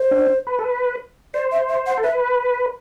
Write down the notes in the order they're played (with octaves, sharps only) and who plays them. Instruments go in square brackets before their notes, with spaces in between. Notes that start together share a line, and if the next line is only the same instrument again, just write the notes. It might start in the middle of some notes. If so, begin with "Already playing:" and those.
Already playing: [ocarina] C5
[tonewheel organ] D4
B4
A4
B4
[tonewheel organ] C5 [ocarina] D5
[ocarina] E5
E5
F#5
[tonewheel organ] A4
[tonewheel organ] B4 [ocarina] E5